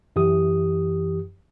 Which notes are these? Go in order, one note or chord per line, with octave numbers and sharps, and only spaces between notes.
F#2 E3 G4 D#6